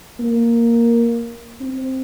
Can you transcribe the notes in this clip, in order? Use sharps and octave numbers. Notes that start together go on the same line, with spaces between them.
A#3
C4